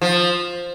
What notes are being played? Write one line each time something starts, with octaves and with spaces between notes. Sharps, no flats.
F3